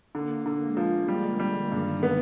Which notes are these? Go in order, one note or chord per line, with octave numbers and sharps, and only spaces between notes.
D3 A#3
D3
G#3
F3
D3 G3
D3 G3
G2 D#3
B3